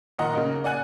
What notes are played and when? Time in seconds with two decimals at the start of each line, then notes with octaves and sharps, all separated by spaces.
0.19 A#2 D#3 D#5 F#5 A#5
0.33 C#3 A#3 D#4
0.64 D5 F#5 G#5 F#6